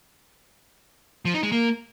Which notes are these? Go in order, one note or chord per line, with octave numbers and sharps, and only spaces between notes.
F3
D#4
G#3
A#3